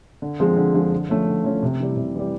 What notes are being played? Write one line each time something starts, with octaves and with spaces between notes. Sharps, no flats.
D3
F3 G#3 C4
D3
F3 G#3 C4
D3
F3 A3 C#4
D3
F3 A3 C#4
C3
E3 G3
C3
E3 G3